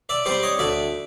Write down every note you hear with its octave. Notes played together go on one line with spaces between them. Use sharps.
D5 E5
G3 C4 C5 D5
C#5 D#5
D2 D5 E5